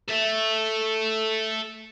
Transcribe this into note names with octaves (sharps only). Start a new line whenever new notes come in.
A4 E5